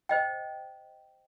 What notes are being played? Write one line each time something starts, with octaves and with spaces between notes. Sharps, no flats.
C5 D#5 G5